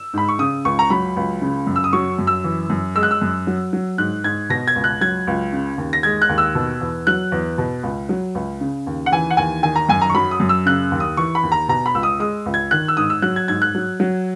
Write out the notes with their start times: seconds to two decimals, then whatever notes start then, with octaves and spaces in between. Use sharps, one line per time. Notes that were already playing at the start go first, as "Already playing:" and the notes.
Already playing: E6
0.13 G#2 B5
0.28 C#6
0.39 C#3 D#6
0.65 C#2 C#6
0.79 A#5
0.90 F#3 B5
1.17 C#2
1.42 C#3
1.67 F#2
1.76 E6
1.84 D#6
1.93 F#3 C#6
2.19 F#2
2.27 E6
2.44 E3
2.70 F#2
2.95 G#3 E6
3.03 F#6
3.11 E6
3.22 F#2
3.47 F#3
3.73 F#3
3.98 G#2 F#6
4.24 G#2 G#6
4.50 B2 A#6
4.68 G#6
4.76 C#2
4.84 F#6
5.01 F#3 G#6
5.27 C#2
5.53 C#3
5.78 D#2
5.93 A#6
6.03 G#3 G#6
6.22 F#6
6.29 D#2
6.38 E6
6.55 B2
6.81 E2
7.07 F#3 F#6
7.32 E2
7.58 B2
7.83 C#2
8.09 F#3
8.35 C#2
8.61 C#3
8.87 D#2
9.06 F#5
9.12 E3 G#5
9.30 F#5
9.37 D#2 G#5
9.63 D#3 G#5
9.76 A#5
9.89 F#2 G#5
10.02 A#5
10.10 C#6
10.14 F#3 B5
10.31 D#6
10.40 F#2
10.49 E6
10.66 C#3 F#6
10.92 D#2
11.00 D#6
11.17 E3 C#6
11.35 B5
11.43 D#2
11.52 A#5
11.69 B2 A#5
11.86 B5
11.95 C#2 E6
12.03 D#6
12.20 G#3 D#6
12.46 C#2
12.54 G#6
12.71 D#3 F#6
12.88 E6
12.97 G#2 D#6
13.10 E6
13.22 F#3 F#6
13.36 G#6
13.48 G#2 G#6
13.62 F#6
13.75 F#3
14.00 F#3